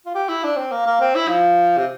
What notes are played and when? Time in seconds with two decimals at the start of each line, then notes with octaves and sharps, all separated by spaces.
0.06 F4
0.15 G4
0.29 E4
0.44 D4
0.57 C4
0.72 A#3
0.87 A#3
1.01 C4
1.15 E4
1.28 F3
1.77 C3